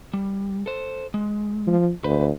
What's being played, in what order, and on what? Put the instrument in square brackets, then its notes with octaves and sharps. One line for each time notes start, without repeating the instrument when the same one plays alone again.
[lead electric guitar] G3
A4 C5
G#3
[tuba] F3
[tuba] D2 [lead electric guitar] B4 C5